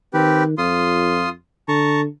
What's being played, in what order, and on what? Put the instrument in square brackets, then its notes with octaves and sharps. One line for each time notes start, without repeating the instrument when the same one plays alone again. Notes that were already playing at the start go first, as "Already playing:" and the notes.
[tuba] D#3 [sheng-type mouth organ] C4 G4 B4
[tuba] F2 [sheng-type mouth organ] F4 C6 D#6
[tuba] D3 [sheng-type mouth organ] A5 A#5 C#6